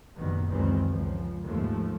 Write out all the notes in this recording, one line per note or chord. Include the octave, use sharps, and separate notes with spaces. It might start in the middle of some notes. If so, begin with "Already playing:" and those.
F#1 C2 A#2 D#3 G3 B3
C#2 F#2 D#3 E3 G3 C4
C#2 F3
D#2 G#2 F3 A3